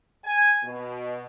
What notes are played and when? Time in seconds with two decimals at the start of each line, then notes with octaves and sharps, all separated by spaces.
0.24 G#5
0.63 B2